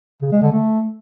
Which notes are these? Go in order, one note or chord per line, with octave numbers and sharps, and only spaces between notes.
C#3
G#3
D3
A3